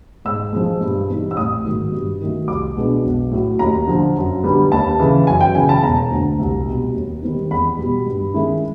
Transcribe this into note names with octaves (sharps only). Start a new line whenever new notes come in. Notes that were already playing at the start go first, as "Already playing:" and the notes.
G#2 E6
F3 G#3
G2
E3 G3 C4 D#4
E6
A1 D#6
G#2 D#3 F#3
G2
D#3 F#3 A3
C2 D6
B2 G#3 B3 D4
B1
A2 F#3
D#2 A#5
D3 F3
F#2
D3 G3 B3
D#2 A5
C#3 E3
F#2 G#5
G5
C#3 E3 G#5
A5
E1 A#5
D2 D3
C2
B2 G3
D#2
D#3 G3 C4 D#4
E2 B5
B2 G3
G2
D#3 G#3 C#4 E4